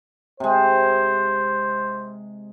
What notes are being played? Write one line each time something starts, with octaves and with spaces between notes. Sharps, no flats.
C3 G#3 C5